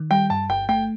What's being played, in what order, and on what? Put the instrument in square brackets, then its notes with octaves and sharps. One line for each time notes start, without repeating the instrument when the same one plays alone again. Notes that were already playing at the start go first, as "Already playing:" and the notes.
Already playing: [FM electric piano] D#3
[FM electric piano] G3 [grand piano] G5
[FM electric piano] G2 [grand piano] A5
[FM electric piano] G1 [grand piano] G5
[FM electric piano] A3 [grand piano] G5